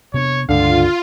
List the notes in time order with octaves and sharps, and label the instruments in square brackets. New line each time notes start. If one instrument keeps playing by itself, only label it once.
[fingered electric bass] C3 B3 D4 [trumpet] C#5
[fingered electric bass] C#2 G2 G#3 [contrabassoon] D3 [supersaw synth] F4 [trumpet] F5